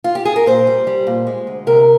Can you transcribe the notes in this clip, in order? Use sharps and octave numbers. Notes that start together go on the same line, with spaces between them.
F4
G4
G#4
A#4
A#2 C5
G3
G3
A#2
G#3
D2
C3 A#4